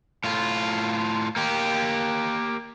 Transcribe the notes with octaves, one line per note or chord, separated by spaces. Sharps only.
A2 F4
A#3 G4